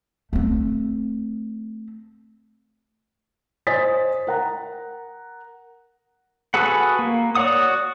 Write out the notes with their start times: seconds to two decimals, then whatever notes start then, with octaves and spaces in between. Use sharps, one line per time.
0.33 A3 C4
3.67 C5 D#5 G#5 D#6 A6 B6
4.27 A#4 F#5 A#5
6.54 F#4 G#4 A4 B4 F#5
6.99 A#3
7.35 F#4 C#5 D5 F#5 D#6